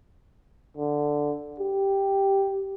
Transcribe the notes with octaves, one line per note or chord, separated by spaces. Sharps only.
D3
G4